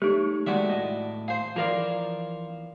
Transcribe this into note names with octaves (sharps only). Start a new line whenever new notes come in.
A3 D#4 G4 C#5
D#3 G#3 A3 F#4 D5 E5
A2 D#5
G#4 C5 F5
E3 F3 F4 A#4 D5